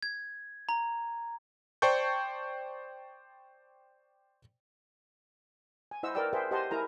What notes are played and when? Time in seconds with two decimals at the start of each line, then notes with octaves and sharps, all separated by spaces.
0.03 G#6
0.69 A#5
1.82 C5 D5 G5 A5 C#6 G6
5.91 G#5
6.03 E4 C5 D#5 F#5 E6
6.15 A#4 B4 D5 G5 E6
6.33 G#4 B4 C5 E5 G5
6.51 G4 C5 D#5 F#5 A5 C6
6.71 E4 G#4 A#4 G#5 A#5